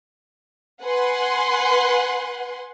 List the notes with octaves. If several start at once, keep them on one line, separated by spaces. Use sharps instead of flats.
B4 F#5 G#5 C6